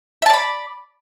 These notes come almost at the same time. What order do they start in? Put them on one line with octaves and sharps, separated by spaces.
E5 A5 D5 B5